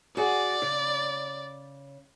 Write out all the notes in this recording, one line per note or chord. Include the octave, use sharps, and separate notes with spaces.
F#4 G#4 D5 F#5
C#3